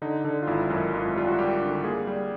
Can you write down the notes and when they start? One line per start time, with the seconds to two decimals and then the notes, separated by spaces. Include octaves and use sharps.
0.02 D3 D#4
0.24 D3
0.43 F4
0.47 G#1 E4
0.70 F#2
0.93 G#1 F4
1.16 G3 F4
1.28 F#4
1.38 G3 G4
1.61 D3
1.84 A#3 G#4
2.07 G3